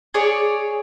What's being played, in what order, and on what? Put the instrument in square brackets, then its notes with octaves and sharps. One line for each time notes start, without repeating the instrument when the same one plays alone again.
[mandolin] G#4 C#5 D5